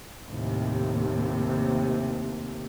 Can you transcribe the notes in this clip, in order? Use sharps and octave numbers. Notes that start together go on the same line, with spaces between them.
D#2 A2 C3